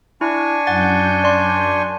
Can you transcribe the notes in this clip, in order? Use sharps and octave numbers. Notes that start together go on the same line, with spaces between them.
D4 E4 G#5 C#6
F#2 F#5 G6 A6
D5 C6